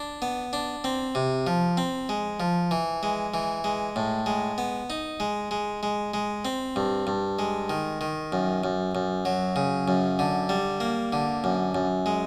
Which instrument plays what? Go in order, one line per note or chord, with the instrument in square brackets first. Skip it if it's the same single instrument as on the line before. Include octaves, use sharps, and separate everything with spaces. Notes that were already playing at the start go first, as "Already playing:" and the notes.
Already playing: [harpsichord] D4
B3
D4
C4
C3
F3
C4
G#3
F3
E3
G#3
E3
G#3
A2
G#3
B3
D#4
G#3
G#3
G#3
G#3
C4
G2
G2
G#3
D#3
D#3
F#2
F#2
F#2
F#3
C#3
F#2
D3
G3
A#3
D3
F#2
F#2
G#3